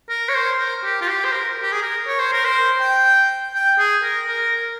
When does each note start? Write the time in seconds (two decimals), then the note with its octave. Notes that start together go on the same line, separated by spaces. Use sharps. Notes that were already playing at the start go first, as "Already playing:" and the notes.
0.09 A#4
0.29 C#5
0.35 C5
0.58 A#4
0.84 G4
1.01 F4
1.08 G4
1.25 C5
1.32 A#4
1.63 G4
1.72 G#4
1.82 A#4
2.07 C#5
2.19 C5
2.33 A#4
2.45 C5
2.81 G5
3.55 G5
3.79 G#4
4.03 A#4
4.29 A#4